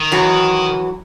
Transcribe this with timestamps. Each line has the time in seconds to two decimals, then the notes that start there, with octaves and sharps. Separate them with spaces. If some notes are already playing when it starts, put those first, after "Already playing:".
Already playing: D#3
0.12 E3 F#3